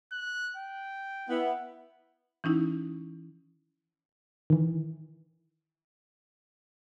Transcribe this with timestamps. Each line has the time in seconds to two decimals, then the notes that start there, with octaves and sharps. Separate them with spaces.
0.12 F#6
0.57 G5
1.29 B3 E4
2.44 E3 C#4 D#4 E4
4.50 D#3 E3